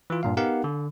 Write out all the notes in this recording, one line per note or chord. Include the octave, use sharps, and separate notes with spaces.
E3 F4
G2 A#2 F5
B3 D#4 G4 A#4 F5 F#5
D3